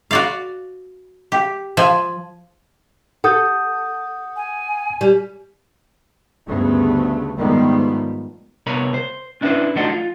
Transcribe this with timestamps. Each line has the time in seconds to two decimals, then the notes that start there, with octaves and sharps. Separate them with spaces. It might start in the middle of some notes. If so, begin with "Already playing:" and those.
0.11 F#4 D5 F5
1.32 G4
1.77 F3 G#5
3.24 A4 F#5 D#6 G6
4.36 G#5
5.01 G3
6.46 D2 G2 C#3 A3 B3
7.37 G#2 D#3 F3 G3 A3 B3
8.67 C2 C3 B3 A#4 C#5 B5
8.94 C5
9.41 C#4 D4 E4 A4 B4 C5
9.76 F3 A3 D4 D#4 F#4 C5
9.89 F4